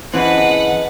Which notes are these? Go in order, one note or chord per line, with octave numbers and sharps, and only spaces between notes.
E3 C4 C#4 G#4 B4 D#5 F#5